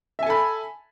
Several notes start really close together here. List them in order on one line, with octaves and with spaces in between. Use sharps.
E5 G#5 A4 B5